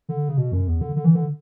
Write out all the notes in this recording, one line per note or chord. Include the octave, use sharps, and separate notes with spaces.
D3
C#3
B2
F#2
E2
D3
D3
E3
D3